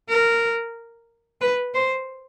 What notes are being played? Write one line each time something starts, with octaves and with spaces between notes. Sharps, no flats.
A#4
B4
C5